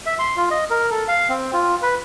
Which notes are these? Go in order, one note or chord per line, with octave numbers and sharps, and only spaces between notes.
E5
C6
F4
D#5
A#4
A4
F5
C4
F4
B4